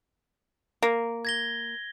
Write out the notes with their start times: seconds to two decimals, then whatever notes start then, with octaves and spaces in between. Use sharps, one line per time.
0.83 A#3
1.25 G#6 A#6 G7